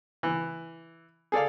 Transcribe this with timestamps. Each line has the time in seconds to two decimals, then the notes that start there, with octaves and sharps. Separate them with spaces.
0.23 E3
1.32 G#4 A4 D5 F5